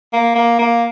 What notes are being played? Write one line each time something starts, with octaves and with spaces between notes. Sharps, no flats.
A#3
A#3
A#3